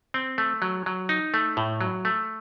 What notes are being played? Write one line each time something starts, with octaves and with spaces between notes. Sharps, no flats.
C4
A3
F#3
F#3
D#4
A3
A2
F#3
A3